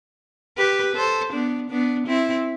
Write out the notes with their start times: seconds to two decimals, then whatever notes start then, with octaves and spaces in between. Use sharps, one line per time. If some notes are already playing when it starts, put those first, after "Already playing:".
0.57 G4 B4
0.95 A4 C5
1.32 B3 D4
1.70 B3 D4
2.07 C4 E4